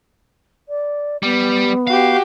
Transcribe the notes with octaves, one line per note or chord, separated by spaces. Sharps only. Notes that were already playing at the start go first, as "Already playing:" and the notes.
D5
G3 B3
F#4 G4 F5